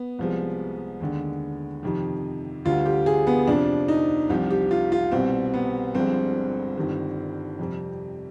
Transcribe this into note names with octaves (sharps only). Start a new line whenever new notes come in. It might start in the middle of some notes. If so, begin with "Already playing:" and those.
Already playing: B3
C2 C3 F3 G#3
D#2 D3 G#3
F2 C3 D#3
D2 D3 G3 F4
G4
G#4
B3
F2 C3 F3 D4
D#4
C2 C3 F3 G4
G4
F4
F4
C2 B2 G3 C4
B3
G1 G2 D3 F3 G#3 C4
G1 G2 D#3 G3
F2 C3 G3